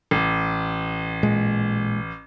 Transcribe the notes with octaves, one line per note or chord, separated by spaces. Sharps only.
A1
A#2 G#3